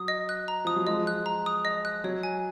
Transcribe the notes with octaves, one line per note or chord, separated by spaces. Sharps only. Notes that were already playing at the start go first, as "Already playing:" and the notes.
Already playing: F#3 D#6
D#5
F#6
A#5
F3 D#6
F#3
F3 G#3 D#5
F#6
A#5
D#6
D#5
F#6
F#3 C#5
G#5